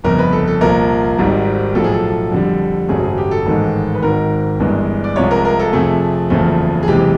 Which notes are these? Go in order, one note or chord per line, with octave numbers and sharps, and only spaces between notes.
G1 F2 C#3 A#4
B4
A4
A4
C2 A#2 F3 A#4
G#1 G#2 D#3 G3
B1 A2 F3 A4
G#4
A4
F2 D3 G3
G#1 F#2 C#3 F#3 A3 G#4
G#4
G4
A4
A1 G#2 D#3 G#3
B4
G#1 G#2 D#3 A#4
G1 G2 E3 G#3
D5
C2 C3 F3 G#3 C#5
A#4
A#4
A4
F2 C3 F3 A3 G#4
F#1 E2 C#3 F3 A3
G#4
F#1 E2 C3 E3 G#3 G4